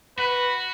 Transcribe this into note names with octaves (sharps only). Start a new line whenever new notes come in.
F#4 B4